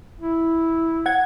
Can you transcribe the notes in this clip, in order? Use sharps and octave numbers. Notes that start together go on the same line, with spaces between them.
E4
F#5 G#6